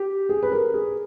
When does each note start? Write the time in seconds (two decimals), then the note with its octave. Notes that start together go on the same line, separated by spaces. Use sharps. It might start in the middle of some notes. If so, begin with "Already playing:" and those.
Already playing: G4
0.29 G#4
0.43 B4
0.52 A#4
0.74 G#4